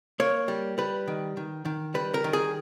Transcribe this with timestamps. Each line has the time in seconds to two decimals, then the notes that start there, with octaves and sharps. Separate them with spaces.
0.20 A#3 C#5
0.48 G3
0.78 G3 B4
1.08 D#3
1.37 D#3
1.65 D#3
1.94 G3 B4
2.14 A#4
2.24 D#3
2.33 G#4